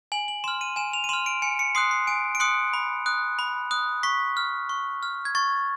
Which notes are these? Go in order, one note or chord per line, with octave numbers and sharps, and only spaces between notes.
G#5 F#7
F#7
C6 F6 E7
D#7
G#5 E7
F7
D#7
C6 F6 E7
D7
G#5 C#7
C#7
C6 D#6 F#6 C7
C7
G#5 D7
D7
C6 D#6 F#6 C#7
B5
D#6 F#6
B5
D#6 F#6
C#6 B6
F6
C#6
F6
G#6
C#6 A6